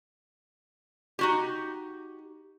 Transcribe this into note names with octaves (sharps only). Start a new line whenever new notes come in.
D#4 F#4 G4